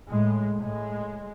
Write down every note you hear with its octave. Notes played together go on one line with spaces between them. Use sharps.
A2 G#3
A2 G#3